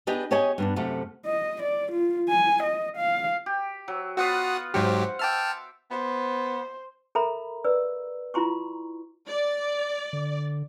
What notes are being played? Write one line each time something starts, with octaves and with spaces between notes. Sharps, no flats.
B3 D4 G4 G#4 D#5
G4 G#4 C#5 D#5 G#5
G2 B3 D4
F#2 C3 A3
D#5
D5
F4
G#5
D#5
F5
G4
F#3
B3 F4 F#4 B4 F#5 D#6
G#2 F#3 G4 C5 F#5
E5 G5 A5 D6 F6
B3 C5
A4 A#4 E5 A#5 B5
B4 D5 E6
E4 F4 A#5 C6 C#6
D5
D3